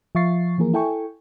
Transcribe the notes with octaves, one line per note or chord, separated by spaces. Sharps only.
F3 E5 F5 C#6 A6 C7
E3 F3 A#3 G#4 A#4
E4 A4 G5 G#5 C#6